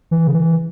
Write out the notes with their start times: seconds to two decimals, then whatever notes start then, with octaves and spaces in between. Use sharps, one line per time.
0.11 E3
0.27 C#3
0.35 E3